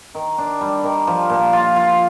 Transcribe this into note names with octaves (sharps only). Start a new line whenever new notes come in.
D#3
D4
G3
D#3
F3
A#2
F4
F4